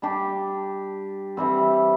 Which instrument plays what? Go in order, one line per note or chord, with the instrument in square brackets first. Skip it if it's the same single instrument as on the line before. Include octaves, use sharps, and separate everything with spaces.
[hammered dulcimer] G3 D4 G4
E3 G3 C4